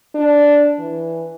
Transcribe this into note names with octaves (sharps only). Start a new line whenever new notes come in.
D4
E3